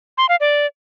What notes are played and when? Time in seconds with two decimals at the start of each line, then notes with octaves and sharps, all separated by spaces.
0.18 C6
0.29 F5
0.40 D5